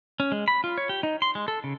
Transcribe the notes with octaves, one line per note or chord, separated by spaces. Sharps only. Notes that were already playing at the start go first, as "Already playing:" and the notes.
C#4
G#3
B5
F4
C#5
G4
D#4
C6
G#3
A4
C#3